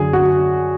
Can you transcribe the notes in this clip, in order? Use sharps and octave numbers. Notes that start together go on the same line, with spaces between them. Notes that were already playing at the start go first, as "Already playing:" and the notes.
Already playing: F#2 D3 G#4
F#4